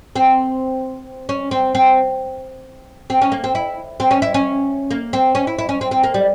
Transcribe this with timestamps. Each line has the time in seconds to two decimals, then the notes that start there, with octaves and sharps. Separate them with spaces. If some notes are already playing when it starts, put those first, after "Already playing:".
0.16 C4
1.29 C#4
1.51 C4
1.75 C4
3.10 C4
3.22 C#4
3.32 A#3
3.44 C4
3.55 E4
4.00 C4
4.11 C#4
4.22 E4
4.34 C#4
4.91 A#3
5.13 C4
5.35 C#4
5.47 E4
5.59 E4
5.69 C#4
5.81 C4
5.91 C4
6.04 A#3
6.14 G3